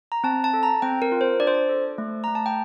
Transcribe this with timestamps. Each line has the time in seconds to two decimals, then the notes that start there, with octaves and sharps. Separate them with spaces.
0.12 A#5
0.24 C4 A5
0.44 A5
0.54 A4
0.63 A#5
0.82 C4 G5
1.02 A#4
1.12 F4
1.21 C5
1.40 D4 D5
1.47 C5
1.55 D5
1.69 A4
1.98 A3
2.24 A3 A#5
2.35 A5
2.46 G5